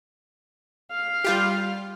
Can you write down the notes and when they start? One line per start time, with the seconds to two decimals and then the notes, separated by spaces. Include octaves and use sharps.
0.91 F5
1.24 G3 F4 G4